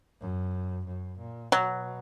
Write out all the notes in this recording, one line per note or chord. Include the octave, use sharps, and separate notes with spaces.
F#2
F#2
A#2
B2 F#3